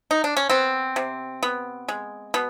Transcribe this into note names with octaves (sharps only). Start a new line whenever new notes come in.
D#4
D4
C#4
B3 C4
C3
B3
G#3
B2 B3